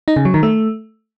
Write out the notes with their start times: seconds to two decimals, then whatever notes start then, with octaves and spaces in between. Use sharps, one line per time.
0.08 D#4
0.16 C#3
0.25 F#3
0.34 D#3
0.43 A3